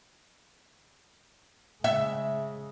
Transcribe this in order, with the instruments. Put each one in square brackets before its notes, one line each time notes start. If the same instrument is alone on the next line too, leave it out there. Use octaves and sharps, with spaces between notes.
[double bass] C#3 G#3 [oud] E5